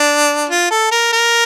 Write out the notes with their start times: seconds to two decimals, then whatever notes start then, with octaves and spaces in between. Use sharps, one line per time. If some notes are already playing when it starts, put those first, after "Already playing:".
Already playing: D4
0.50 F4
0.71 A4
0.92 A#4
1.13 A#4